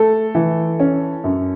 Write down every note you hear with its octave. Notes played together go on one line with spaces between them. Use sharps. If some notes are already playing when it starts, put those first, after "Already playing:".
Already playing: A3 A4
E3
C#4
F#2